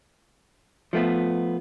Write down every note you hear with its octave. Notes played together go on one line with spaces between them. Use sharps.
F3 A3 B3